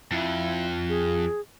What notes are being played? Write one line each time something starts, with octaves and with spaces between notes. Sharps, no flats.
F2 E4
G#4